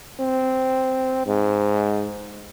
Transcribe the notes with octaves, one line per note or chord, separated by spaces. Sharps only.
C4
G#2